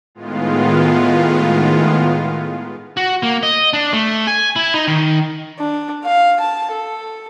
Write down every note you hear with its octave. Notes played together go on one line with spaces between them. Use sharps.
A2 D#3 G#3 B3 F4
F#4
A#3
D#5
D4
A3
G#5
E4
D#4
D#3
D4
F5
A5
A4